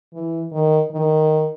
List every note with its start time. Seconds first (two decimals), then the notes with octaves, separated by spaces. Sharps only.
0.14 E3
0.52 D#3
0.91 D#3